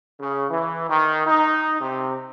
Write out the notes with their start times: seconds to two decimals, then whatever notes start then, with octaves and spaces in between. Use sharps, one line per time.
0.19 C#3
0.49 E3
0.89 D#3
1.26 D#4
1.80 C3